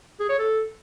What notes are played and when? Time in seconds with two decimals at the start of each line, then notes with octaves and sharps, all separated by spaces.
0.20 G#4
0.29 C#5
0.39 A4